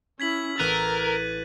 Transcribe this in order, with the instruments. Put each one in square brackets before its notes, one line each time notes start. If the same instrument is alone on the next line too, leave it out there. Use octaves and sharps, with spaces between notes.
[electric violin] C#4 E4 [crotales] G#6 B6 F#7
[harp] A1 D6 E6 [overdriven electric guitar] A#4 [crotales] F#6 D#7 [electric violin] A6